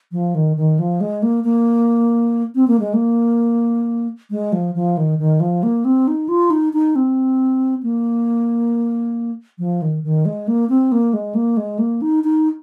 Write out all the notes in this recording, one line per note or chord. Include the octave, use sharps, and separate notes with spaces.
F3
D#3
D#3
F3
G#3
A#3
A#3
C4
A#3
G#3
A#3
G#3
F3
F3
D#3
D#3
F3
A#3
C4
D#4
F4
D#4
D#4
C4
A#3
F3
D#3
D#3
G#3
A#3
C4
A#3
G#3
A#3
G#3
A#3
D#4
D#4